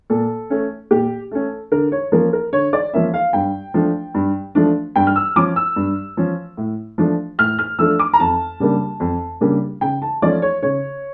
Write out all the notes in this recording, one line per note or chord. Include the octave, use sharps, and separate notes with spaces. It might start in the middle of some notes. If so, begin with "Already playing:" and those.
A#2 A4
A3 C#4
A#2 G4
A3 C#4 A4
D3 A#4
C#5
F3 A#3 C#4 A#4
A#4
D3 C#5
D5
F3 A#3 C#4 E5
F5
G2 G5
F3 A3 D4
G2
F3 A3 D4
G2 G5
F6
E6
F3 C#4 D6
E6
G2
F3 C#4
A2
F3 A3 D4
A2 F6
F6
F3 A3 D4 E6
D6
A#5
F2 A5
C#3 G3 A#3 D4
F2
C#3 G3 A#3 D4
C#3 G5
A5
F3 A3 C#4 D5
C#5
C#3 C#5